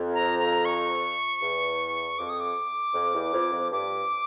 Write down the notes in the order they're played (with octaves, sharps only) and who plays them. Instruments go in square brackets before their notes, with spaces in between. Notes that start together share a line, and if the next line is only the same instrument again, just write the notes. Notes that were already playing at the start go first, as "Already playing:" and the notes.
Already playing: [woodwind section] F2
[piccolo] A#5
A#5
C#6
[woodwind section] E2
[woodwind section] F2 [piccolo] D6
[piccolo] D#6
D6
[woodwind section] F2
E2
F2
F2
[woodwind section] G2 [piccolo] D6